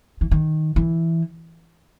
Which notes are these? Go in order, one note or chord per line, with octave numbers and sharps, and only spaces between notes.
E3
D#3
E3